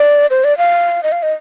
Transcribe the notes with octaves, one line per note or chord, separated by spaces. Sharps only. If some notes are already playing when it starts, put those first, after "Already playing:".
Already playing: D5
C5
D5
F5
D#5
F5
D#5